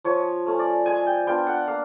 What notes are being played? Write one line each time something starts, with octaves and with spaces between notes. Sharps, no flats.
F3 C#5
A3 C#4
D5
G#3 G#5
G5
B3 D4 F4 G5
F#5
A#3 F5